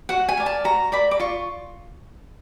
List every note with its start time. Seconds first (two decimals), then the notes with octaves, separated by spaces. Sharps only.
0.09 F#4 F#5
0.29 G#5
0.37 A#4 D5
0.46 A5
0.64 F#4 A#5
0.92 A#4 D5 B5
1.11 D6
1.20 F4 C#6